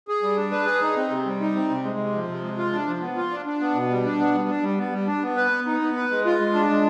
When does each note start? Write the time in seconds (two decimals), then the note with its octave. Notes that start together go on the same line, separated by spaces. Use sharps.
0.08 G#4
0.23 G3
0.36 D4
0.51 B4
0.66 G#4
0.82 D#4
0.96 C4
1.10 C3
1.26 G3
1.40 D#4
1.55 C4
1.70 C3
1.83 G#3
1.98 C3
2.14 F3
2.27 C3
2.42 G#3
2.58 F4
2.73 D4
2.87 F3
3.01 B3
3.16 F4
3.31 D4
3.46 D4
3.61 B3
3.75 B2
3.89 G3
4.05 D4
4.19 B3
4.34 G3
4.48 D4
4.63 G3
4.78 B3
4.92 G3
5.07 D4
5.23 B3
5.36 B4
5.51 B3
5.66 D#4
5.81 B3
5.96 B4
6.11 G#3
6.25 F4
6.40 G#3
6.54 D4
6.69 G#3